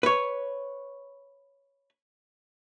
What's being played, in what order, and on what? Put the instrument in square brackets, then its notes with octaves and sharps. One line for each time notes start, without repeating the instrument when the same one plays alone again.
[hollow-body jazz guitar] B4 C#5